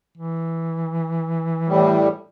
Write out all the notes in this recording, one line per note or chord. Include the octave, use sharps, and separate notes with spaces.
E3
A2 G3